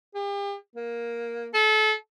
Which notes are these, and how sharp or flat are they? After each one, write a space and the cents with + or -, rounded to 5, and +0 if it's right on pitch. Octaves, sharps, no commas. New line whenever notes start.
G4 +40
A#3 +10
A4 -30